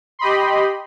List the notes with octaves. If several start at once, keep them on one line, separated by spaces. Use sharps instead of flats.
G4 D#5 B5 C6